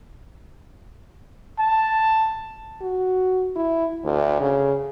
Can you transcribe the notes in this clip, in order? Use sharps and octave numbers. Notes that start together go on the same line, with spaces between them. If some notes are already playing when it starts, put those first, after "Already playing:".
A5
F#4
E4
D2
C#3